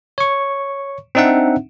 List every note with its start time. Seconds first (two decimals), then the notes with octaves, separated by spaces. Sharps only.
0.18 C#5 C#6
1.15 C4 D4 D#4 E5 F#5